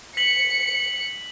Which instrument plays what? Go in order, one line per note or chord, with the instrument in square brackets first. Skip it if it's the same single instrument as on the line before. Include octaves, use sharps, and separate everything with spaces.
[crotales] B6 F#7 [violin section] C#7